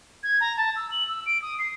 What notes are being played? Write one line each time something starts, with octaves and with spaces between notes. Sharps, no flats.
G#6
A#5
A5
E6
F#7
E6
D7
D#6
C7